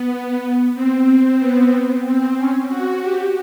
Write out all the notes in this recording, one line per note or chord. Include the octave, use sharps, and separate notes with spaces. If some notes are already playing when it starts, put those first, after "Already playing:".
Already playing: B3
C4
C4
B3
C4
C#4
F#4
G4